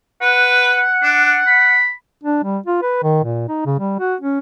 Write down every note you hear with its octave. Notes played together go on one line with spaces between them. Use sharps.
B4 F#5
D4
B5
D4
G3
F4
B4
D#3
A#2
D#4
C#3
G3
F#4
C#4